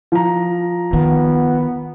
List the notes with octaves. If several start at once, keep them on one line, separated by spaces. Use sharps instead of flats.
F3 A#5
D#3 B3